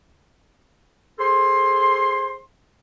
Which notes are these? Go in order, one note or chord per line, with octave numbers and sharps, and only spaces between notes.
G#4 A4 C5 C6